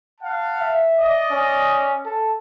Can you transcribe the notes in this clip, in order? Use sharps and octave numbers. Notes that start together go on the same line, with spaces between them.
F5 F#5 A5
E5
D5 D#5 D#6
C#4
A4